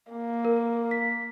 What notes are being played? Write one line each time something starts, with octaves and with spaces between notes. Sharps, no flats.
A#3
A#4
B6